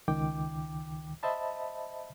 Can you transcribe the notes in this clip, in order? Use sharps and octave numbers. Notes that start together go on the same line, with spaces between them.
C#2 D#3 G5 D6
C5 D#5 E5 A5 B5